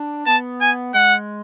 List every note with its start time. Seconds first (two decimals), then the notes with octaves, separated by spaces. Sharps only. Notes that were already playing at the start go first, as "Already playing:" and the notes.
Already playing: D4
0.26 B3 A5
0.61 G#5
0.94 G#3 F#5